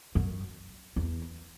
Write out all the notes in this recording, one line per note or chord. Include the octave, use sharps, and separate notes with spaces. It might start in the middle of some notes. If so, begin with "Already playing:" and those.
F#2
E2